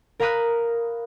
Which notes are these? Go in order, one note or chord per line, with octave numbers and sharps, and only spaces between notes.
A#4 F5 A#5 B5 D#6 F#6